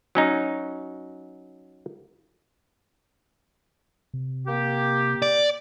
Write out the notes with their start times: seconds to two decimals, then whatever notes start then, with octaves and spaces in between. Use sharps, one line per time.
0.15 F#3 C#4 D#4
4.14 C3
4.47 A#3 G4
5.22 D5